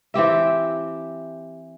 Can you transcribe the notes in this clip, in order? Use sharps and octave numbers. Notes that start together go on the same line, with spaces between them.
E3 C4 G4 E5